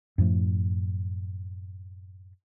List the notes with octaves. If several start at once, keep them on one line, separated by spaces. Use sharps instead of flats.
F#2 A2 F3 A3